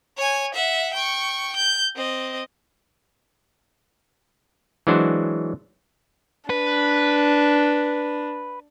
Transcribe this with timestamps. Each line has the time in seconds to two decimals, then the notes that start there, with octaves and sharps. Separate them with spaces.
0.17 C#5 G#5
0.54 E5 F#5
0.94 G5 C#6
1.56 G6
1.96 C4 D#5
4.87 E3 F#3 G#3 D4 F#4 C5
6.50 D4 B4